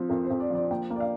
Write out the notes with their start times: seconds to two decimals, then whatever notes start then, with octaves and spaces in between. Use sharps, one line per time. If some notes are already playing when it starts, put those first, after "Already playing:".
Already playing: F3 C4
0.09 F2 A#4
0.25 C5
0.30 F2
0.40 D5
0.50 F3 D5
0.71 A#3 G5
0.90 A#3
0.96 D5
1.00 F5